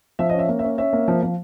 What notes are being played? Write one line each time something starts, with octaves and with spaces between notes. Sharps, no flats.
F3 E5
C#4 D#5
E5
A#3
E5
C#4
C#4 E5
A#3
F3
F3